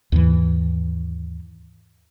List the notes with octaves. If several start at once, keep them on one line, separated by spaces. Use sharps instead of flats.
D#2 G#2 E3